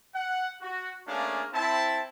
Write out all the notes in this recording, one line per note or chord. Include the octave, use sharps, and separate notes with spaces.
F#5
F#4
A3 A#3 C#4 D4 G#4 F5
C4 E4 A5